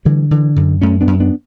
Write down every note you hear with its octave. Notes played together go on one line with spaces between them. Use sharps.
D3 E3 G3
D3 E3
F#2 D3
F#2 A3 C#4
B3 D4
F#2
B3 D4